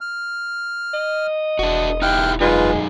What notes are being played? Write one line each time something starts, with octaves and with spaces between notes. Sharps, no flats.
F6
D#5
E1 D4 F#4
D#4 E4 G4 G5 F6 F#6
F#2 C#3 G#3 D#4 F4 B4